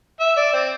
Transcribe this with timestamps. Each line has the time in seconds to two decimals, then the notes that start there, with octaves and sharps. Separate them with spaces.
0.20 E5
0.37 D5
0.53 C4